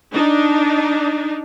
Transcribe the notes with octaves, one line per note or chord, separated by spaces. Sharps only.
D4 D#4